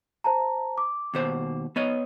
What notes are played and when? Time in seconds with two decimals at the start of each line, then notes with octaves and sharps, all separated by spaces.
0.24 C5 A5 A#5
0.78 D6
1.14 D#2 B2 C5
1.76 B3 C#5 D#5